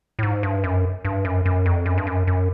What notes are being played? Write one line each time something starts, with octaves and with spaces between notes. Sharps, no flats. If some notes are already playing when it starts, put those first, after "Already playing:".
A2
G#2
G2
F#2
G2
F#2
F#2
F2
F#2
G2
F#2
F#2